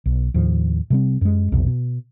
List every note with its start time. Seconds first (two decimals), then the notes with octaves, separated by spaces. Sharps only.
0.06 B1
0.34 D#2 A2 F3
0.90 C3 G3 C4
1.21 F#2 G#3
1.52 B1 F2 C3
1.67 B2